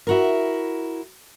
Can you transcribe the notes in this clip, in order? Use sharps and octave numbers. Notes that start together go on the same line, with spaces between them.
E4 F#4 A#4